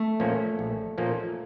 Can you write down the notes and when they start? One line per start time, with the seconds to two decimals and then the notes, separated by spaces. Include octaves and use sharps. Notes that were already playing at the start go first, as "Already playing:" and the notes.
Already playing: A3
0.20 A#2 F3 A#3 C#4
0.59 A#1
0.98 A#2 F3 A#3 C#4